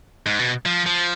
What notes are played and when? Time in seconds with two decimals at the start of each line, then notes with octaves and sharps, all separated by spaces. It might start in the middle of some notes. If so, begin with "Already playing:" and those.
0.26 G#2
0.39 B2
0.66 F3
0.86 F3